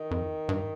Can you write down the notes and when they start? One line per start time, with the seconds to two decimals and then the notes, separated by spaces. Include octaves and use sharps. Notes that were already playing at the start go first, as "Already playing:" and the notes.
Already playing: D#3
0.11 F2
0.49 G2